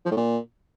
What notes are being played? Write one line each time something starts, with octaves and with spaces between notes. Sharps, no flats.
F3
A2
A#2